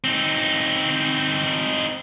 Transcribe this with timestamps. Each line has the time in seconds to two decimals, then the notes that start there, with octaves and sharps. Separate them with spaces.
0.04 C4 D#4